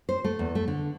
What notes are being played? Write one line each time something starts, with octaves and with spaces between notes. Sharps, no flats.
C5
A3
E2
A3
D3